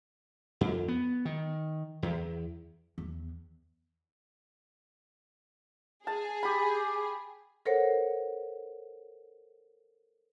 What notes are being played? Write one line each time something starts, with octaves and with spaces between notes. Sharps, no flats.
F2
B3
D#3
E2
E2
G#4 A5
G4 B5
A4 A#4 C5 C#5 F#5